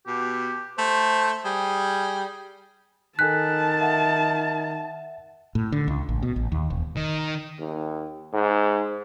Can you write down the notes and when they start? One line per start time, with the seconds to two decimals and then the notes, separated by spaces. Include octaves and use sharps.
0.07 B2 G4
0.78 A3 C5
1.45 G3 G#4
3.19 D#3 A4 G#5 A5 F#6 B6
3.81 E5 F#5
5.55 A2
5.72 D3
5.88 C#2
6.09 A1
6.23 B2
6.36 A1
6.52 D#2
6.70 E1
6.97 D#3
7.59 D#2
8.33 G#2